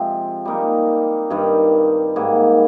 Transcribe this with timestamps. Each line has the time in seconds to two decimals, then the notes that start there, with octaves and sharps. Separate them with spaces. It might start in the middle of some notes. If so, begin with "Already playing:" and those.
Already playing: C3 F3 G#3 C4
0.45 G3 A#3 D#4 A#4
1.30 G2 D#3 G3
2.16 G#2 G3 A#3